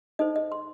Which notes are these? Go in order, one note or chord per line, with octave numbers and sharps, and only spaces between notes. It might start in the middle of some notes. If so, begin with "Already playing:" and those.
D#4 A4 C5 D#5
D#5
C6